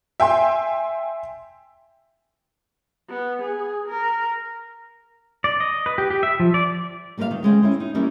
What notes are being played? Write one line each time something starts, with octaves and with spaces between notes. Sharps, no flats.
E5 G5 G#5 C6
B3
G#4
A#4
D5
D#5
B4
G4
G4
E5
F3
D5
G3 A#3 B4 C5 F5
D#3
C#3 G#3 C4 G5
C#4 E4 C5
D#4
E3 G3 A#3 C#4 E4 G4